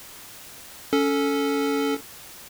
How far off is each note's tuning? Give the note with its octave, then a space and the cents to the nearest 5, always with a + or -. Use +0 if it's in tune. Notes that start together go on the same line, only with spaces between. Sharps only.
C#4 +15 A4 +0